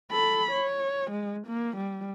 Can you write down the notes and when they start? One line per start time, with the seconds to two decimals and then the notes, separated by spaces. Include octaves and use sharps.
0.12 A4 B5
0.52 C#5
1.11 G#3
1.47 A#3
1.77 G3